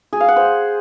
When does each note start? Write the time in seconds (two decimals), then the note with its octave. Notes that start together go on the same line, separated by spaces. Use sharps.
0.13 G#4
0.21 F5
0.28 F#5
0.36 C5